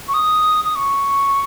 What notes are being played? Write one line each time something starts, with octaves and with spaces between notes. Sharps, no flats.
C#6
D#6
D#6
C#6